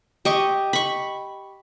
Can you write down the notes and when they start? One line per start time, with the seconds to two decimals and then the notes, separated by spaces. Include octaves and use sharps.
0.25 G4 D#5 C#6
0.73 B5 C#6